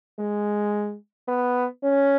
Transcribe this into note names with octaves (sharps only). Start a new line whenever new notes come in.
G#3
B3
C#4